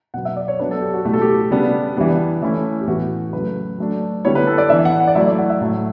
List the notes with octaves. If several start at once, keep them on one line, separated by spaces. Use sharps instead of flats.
B2 F#3 B3 F#5
E5
D5
C#5
F#3 B3 D4 B4
A4
G4
F#4
B2 A3 E4 G4
A4
G4
C#3 G3 B3 D4
E3 G3 B3 D4
E3 A3 C#4 E4
G4
A2 E3 B3 F#4
C#3 F#3 A3 B4
F#3 A3 D4
D3 G3 B3 E4 C#5
B4
A4
D5
E3 B3 D4 E5
F#5
F#5
D5
F#3 A3 E4 E5
D5
F#5
E5
A2 F#3 A3